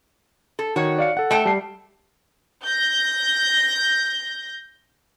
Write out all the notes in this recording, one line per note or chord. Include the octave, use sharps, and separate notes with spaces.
A4
D#3 F#4 C#5
D5 F5 C#7
A4 F#5
A3 G5 A5
G3 C7
G6 A#6